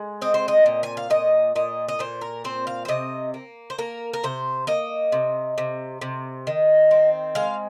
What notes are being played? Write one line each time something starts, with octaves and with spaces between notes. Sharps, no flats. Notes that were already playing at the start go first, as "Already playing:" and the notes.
Already playing: G#3
C4 D#5
C5
D#5
A#2
G#5
F5
A#2 D#5
A#2 D#5
D#5
A#2 C5
A#4
C4 C5
F5
C5
C3 D#5
A#3
C5
A#3 A#4
A#4
C3 C5
A#3 D#5
C3
C3
C3
D#3
C4
G#3 F5